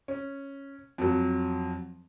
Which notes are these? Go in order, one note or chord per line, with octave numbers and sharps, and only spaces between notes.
C#4
F2 F#3